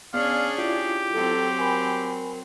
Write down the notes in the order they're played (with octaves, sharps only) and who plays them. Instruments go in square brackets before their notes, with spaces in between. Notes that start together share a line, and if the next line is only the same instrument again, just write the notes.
[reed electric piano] B3 [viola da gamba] C#4 D4 G#4 [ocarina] D5 [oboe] F5
[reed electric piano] E4 F4 [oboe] G4
[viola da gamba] F#3 C4 [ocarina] A4
[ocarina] A#4 [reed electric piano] G#5 B5